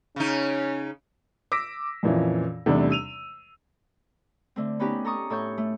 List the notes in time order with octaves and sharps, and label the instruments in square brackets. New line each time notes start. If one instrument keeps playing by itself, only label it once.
[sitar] C#3 D#4 [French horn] C#4
[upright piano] D6 E6 A#6 B6 D7
F2 A#2 E3 C#4 E4
E2 C3 G3 A3 D4 D#4
E6 D#7 F7
[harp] D3 A3 C4
B3 C#4 D#4 G4 B4
A4 A#5 C#6 D#6
A2 A4 C#5 C#6 G6
A3